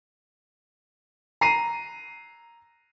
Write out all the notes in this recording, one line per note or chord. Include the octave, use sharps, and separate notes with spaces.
A#5 C7 D#7